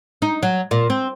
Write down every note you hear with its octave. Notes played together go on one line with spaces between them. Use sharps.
D#4
F#3
A#2
C4